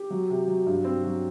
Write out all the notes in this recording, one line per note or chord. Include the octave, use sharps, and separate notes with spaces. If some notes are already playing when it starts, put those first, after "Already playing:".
Already playing: G4
F#3
C3
F#3
G2
C4
F#3